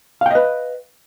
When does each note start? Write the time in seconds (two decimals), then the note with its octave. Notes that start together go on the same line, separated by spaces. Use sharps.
0.21 F5
0.26 G5
0.31 D#5
0.35 B4